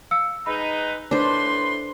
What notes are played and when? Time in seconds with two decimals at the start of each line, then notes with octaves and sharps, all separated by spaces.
0.11 F5 E6 C#7
0.46 G#3 D#4 B4 B5
1.11 A2 D4 B4 C5 C6